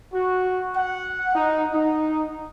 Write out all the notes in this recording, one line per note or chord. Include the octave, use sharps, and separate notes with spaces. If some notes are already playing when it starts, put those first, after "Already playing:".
F#4
F#5
D#4
D#4